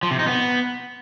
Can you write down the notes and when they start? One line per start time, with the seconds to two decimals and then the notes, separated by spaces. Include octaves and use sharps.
0.03 F3
0.11 C3
0.19 D#4
0.27 B3